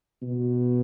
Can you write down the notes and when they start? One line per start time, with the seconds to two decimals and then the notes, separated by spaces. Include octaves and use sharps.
0.22 B2